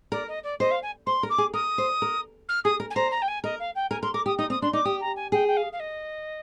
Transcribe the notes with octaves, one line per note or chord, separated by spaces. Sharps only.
A#4 D5
D#5
D5
C5 D#5
F5
G#5
C5 C6
A#4
D6
G#4
A#4 D#6
C5
A#4
F6
G#4 D#6
A#4
G#5
C5 A#5
A#5
G5
G#5
A#4 D#5
F5
G5
A#4 G#5
A#4 C6
A#4 D6
G4 D#6
D#4 D#6
C4 D#6
D4 C6
D#4 D6
G4 D#6
A#5
G#5
G#4 G5
G5
F5
F5
D#5